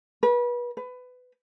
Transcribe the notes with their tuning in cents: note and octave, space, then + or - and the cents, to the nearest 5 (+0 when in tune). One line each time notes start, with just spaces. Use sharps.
B4 -30
B4 +20